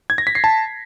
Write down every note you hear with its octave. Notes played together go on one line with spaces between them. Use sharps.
G#6
A#6
B6
C7
A5